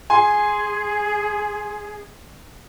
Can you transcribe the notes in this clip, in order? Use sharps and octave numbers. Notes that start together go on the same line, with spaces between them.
G#4 G#5 C6